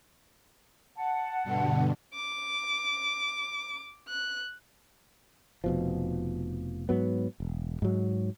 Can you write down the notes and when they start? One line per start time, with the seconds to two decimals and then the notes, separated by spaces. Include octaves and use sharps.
0.96 F#5 A5
1.44 G2 B2 D3
2.14 D6
4.08 F#6
5.64 F1 B2 F3
6.89 G#2 F#3 B3
7.40 E1
7.82 G#2 F#3